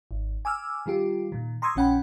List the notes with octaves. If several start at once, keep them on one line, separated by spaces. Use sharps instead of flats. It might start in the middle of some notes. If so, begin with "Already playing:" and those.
G#1
G#5 D6 E6 F6
D#3 G3 F4 G4
A#2 D#3
A#5 C6 C#6 D#6 E6 G#6
A#1 D#3 C#4 F#5 G5 B5